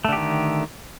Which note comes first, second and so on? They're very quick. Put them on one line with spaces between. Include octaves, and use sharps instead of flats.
A3 D3 G4 D#3